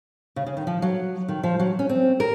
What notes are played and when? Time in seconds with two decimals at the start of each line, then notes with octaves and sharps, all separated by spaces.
0.36 C#3
0.46 C#3
0.57 D#3
0.67 F3
0.82 F#3
1.28 D#3
1.43 F3
1.60 F#3
1.79 C#4
1.89 C4
2.20 A#4